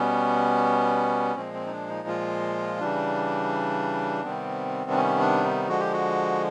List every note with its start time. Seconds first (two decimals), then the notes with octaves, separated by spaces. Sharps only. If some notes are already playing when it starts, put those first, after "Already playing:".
Already playing: B2 G3 B3 C#4
1.35 A#2 F3 G#3 C4
1.54 C4
1.66 D#4
1.71 D4
1.89 D#4
2.08 F4
2.80 C#3 E3 G3 D4
4.24 C3 D#3 G3 B3 C4
4.90 D4
4.96 C#4
5.20 D4
5.44 D#4
5.68 D3 F3 G#3 F#4
5.80 G4
5.93 F#4